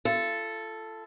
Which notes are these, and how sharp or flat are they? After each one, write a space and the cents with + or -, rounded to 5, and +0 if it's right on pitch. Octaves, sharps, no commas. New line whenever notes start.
F4 -40 A4 +0